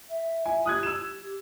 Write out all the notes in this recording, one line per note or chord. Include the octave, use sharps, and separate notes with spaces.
E5
E5 G#5
G4 D#6 F#6 G#6
E6 E7
G4